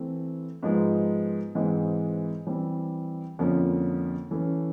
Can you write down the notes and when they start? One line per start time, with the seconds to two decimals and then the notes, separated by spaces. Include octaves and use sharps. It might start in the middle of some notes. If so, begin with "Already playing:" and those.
Already playing: E3 A3 C4
0.63 G#2 F3 G#3 B3 D#4
1.55 G#2 E3 G#3 C4
2.47 E3 G3 C4
3.39 F2 D3 F3 A#3 C#4
4.31 E3 A3 C#4